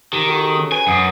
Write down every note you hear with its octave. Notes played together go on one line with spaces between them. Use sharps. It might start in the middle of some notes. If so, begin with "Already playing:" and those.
D#3 G4
F#4 A4
G#4
C#4
B4 G#5
F#2 F#5 D#6